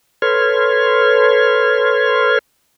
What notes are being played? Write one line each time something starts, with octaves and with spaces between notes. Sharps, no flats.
A4 B4 C#5 C6 F6 G#6